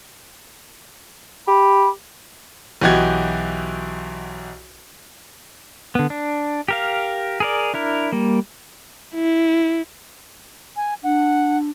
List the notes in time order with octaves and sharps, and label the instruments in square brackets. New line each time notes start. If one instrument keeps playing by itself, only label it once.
[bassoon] G4 [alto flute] B5
[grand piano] B1 E3 F#4 G4 D#5 G#6
[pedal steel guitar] D3 B3
D4
G4 A#4 F5
G#4 A#4 D5
D4 E4 A#4
G3 A#3
[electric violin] E4
[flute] G#5
[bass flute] D4 [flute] F#5